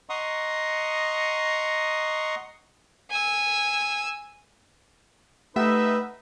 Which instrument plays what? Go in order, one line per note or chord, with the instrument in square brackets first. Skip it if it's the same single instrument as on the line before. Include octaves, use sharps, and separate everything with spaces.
[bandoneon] D#5 F#5 A#5 C6 C#6 D#6
[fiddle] G#5 E6
[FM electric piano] A3 G4 F#5 [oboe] D#4 [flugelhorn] B4 [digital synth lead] E5